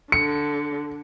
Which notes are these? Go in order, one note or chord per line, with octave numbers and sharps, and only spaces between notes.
D3 C#7